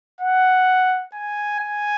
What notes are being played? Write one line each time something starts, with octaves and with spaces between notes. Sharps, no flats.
F#5
G#5
G#5